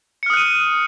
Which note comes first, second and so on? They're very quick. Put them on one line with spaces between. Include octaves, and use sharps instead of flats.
C#7 F6 D#6 F#6 D#7